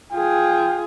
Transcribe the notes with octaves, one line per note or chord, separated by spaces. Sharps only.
F4 G#4 G5